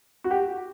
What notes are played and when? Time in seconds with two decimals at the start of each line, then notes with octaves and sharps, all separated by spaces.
0.24 F#4
0.31 G4